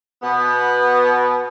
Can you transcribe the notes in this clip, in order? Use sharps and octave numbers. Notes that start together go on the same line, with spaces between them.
B2 B3